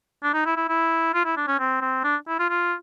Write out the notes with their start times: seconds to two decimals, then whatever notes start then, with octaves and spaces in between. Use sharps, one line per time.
0.23 D4
0.34 D#4
0.46 E4
0.57 E4
0.69 E4
1.14 F4
1.25 E4
1.37 D4
1.48 C#4
1.59 C4
1.81 C4
2.04 D4
2.28 E4
2.39 F4
2.50 F4